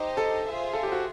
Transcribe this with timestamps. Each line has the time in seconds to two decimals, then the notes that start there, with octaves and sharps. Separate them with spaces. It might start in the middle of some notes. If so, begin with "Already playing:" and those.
Already playing: D#4 G4 C5 D#5
0.17 A4
0.45 F4 G#4 C5 E5
0.73 A4
0.83 G4
0.92 F#4